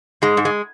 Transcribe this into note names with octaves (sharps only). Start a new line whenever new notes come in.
G#2 G#3
G#2
G#3